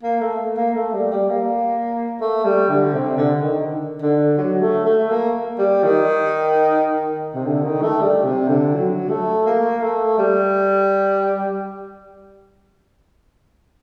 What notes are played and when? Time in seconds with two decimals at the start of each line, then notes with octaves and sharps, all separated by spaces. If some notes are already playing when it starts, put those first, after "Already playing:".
0.03 A#3
0.21 A3
0.57 A#3
0.75 A3
0.93 G3
1.11 G3
1.30 A#3
2.20 A3
2.44 G3
2.69 D3
2.93 C3
3.17 D3
3.42 D#3
4.02 D3
4.38 F#3
4.62 A3
4.86 A3
5.10 A#3
5.58 G3
5.83 D#3
7.34 C3
7.46 D3
7.64 D#3
7.82 A3
8.01 G3
8.25 C3
8.49 D3
8.74 F#3
9.09 A3
9.46 A#3
9.81 A3
10.18 G3